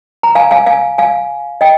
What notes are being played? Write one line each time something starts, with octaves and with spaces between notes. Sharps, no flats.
A#5
F5 G#5
F5 G#5
F5 G#5
F5 G#5
D#5 G5